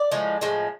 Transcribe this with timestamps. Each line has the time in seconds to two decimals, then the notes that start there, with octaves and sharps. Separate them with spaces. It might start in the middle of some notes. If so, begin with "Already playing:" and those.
Already playing: D5
0.12 A2 F3 G#3
0.41 A2 F3 G#3